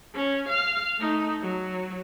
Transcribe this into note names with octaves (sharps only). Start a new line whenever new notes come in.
C#4
F5
A3 D#4
F#3